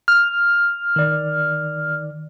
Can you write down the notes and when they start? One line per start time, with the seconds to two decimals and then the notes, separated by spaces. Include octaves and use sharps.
0.08 F6
0.96 D#3 D5